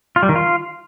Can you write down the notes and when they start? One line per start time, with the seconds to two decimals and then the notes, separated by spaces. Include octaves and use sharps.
0.16 F4
0.23 G3
0.29 D#3
0.36 F4